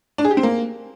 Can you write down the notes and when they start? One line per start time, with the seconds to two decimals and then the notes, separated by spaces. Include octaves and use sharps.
0.18 D4
0.25 G#4
0.31 G4
0.37 C4
0.43 A#3